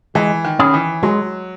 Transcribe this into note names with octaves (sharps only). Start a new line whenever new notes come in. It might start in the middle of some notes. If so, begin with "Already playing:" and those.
E3 G#3
D#3
C#4 E4 G#4
E3
F#3 G#3